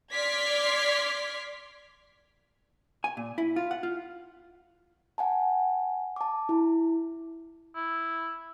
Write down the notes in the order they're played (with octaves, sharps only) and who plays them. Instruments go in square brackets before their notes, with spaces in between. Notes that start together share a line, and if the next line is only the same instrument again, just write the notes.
[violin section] D5 C6 D6 F6 G#6 B6
[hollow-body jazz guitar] G#5
A#2
E4
F4
F#5
F4
[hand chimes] F#5 G#5 A5
A5 D6
E4
[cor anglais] E4